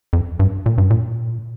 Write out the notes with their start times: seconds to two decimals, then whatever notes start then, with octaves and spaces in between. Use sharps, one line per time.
0.13 F2
0.39 G2
0.66 A#2
0.78 G2
0.90 A#2